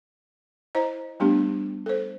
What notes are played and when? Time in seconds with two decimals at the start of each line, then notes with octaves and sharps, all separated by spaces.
0.75 E4 C5 D#5 A#5
1.20 G3 A3 B3 D4 G4
1.86 A4 C5